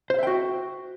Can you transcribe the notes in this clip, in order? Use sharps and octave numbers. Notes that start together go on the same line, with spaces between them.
F#4 C5 E5 F5 G5